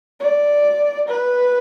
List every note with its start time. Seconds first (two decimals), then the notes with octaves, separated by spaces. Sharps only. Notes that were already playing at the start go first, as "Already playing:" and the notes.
0.20 D5
1.09 B4